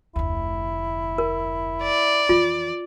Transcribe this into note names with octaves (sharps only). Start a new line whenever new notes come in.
F1 D2 E4
A#4
D5
F2 E3 F4